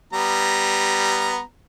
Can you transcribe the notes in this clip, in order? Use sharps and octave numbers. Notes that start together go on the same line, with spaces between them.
G3 B3 A#5